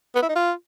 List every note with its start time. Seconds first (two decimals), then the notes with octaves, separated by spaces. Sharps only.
0.15 B3
0.22 E4
0.29 D#4
0.35 F4